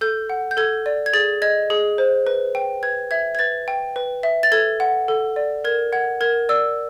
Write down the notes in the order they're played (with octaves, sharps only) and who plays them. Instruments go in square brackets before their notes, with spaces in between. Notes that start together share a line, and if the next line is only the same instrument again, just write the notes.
[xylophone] A4 G6
F#5
G6
A4 G#6
D5
G#6
G#4 A6
D#5 G#6
G#4
C5
B4
G5
B4 G#6
E5 G#6
G#6
B4 A6
G5
B4
E5
A6
A4 G#6
F#5
A4
D5
A#4 G#6
F#5 G#6
A#4 G#6
D5 E6